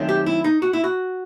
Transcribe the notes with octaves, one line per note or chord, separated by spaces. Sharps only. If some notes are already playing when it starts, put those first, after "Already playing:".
Already playing: F#2 D#3 A3 C4
G4
E4
D#4
F#4
E4
F#4